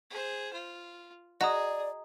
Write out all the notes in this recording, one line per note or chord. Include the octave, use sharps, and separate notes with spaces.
G#4 C5
F4
F#4 G#4 D5 D#5 A#5 D#6